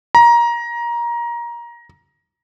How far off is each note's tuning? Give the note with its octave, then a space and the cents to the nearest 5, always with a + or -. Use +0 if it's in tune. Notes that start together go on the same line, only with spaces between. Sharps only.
A#5 +20